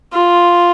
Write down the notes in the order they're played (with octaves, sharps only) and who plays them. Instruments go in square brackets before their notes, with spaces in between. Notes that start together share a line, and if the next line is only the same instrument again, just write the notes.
[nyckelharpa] F4